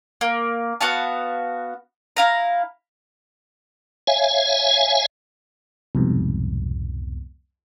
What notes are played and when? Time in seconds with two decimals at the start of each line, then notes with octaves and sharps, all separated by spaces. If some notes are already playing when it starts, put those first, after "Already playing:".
0.21 A#3
0.81 B3 F#4 F5 A5
2.17 E4 F5 A#5
4.07 C#5 E5 F5 G#5
5.95 C2 F2 G#2 B2